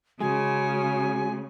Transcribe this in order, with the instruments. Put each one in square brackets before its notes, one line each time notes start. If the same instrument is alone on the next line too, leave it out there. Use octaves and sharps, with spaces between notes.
[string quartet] C#3 [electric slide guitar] G#3 [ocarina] F#4 [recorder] G#5